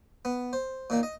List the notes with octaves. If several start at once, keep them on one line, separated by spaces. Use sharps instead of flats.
B3
C5
A#2 D#3 A#3
D#5